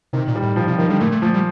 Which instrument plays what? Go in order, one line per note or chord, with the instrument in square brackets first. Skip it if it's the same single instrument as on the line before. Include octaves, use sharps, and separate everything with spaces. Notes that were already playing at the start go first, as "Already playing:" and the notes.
[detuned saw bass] C3 [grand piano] D#3
[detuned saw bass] A#2
[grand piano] G3
[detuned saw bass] A2
[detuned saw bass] A#2 [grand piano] F3
[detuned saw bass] C3 [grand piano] F3
[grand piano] D#3 [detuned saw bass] F3
[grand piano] D3 [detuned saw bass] G3
[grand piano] A#2 [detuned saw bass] A3
[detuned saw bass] A3
[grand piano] F3 [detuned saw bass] A3
[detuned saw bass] G3